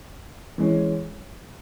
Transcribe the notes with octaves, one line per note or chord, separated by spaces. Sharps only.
E3 G#3 C#4